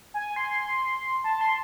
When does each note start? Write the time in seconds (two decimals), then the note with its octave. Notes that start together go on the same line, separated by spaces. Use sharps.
0.14 G#5
0.36 C6
1.24 A5
1.41 C6